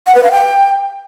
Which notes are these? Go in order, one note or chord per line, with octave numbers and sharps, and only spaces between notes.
F#5
B4
F5
G5